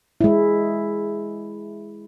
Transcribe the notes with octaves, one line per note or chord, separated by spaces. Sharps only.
G#3 E4